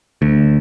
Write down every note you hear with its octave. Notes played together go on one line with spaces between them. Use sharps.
D2